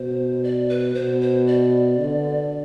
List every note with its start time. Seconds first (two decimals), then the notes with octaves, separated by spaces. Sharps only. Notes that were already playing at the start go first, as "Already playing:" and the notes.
Already playing: B2 C5
0.43 D5
0.69 B4
0.95 B2 C5
1.21 C5
1.47 D5
1.99 D3